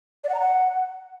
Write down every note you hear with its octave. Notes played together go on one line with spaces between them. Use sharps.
D5
F#5
A#5
F#5